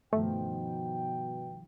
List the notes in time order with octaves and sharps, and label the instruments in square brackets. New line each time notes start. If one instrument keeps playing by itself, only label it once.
[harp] G2 D#3 F3 [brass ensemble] B2 G5 [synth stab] A3